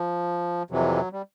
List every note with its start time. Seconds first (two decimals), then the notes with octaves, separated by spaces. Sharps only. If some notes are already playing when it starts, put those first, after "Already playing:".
Already playing: F3
0.70 F2 C3 E3 F#3
1.13 G3